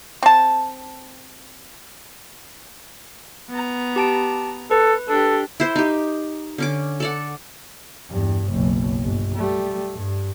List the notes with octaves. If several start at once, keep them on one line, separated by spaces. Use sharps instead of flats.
C4 A5
B3 A#5
G4 A5 D7
A4 B4
D4 G4 A4
E4 C5
D#4 G4
D3 C#4 D6
A4 D5 F#5
E2 G2
F#1 B1
G1
G3 A3
G2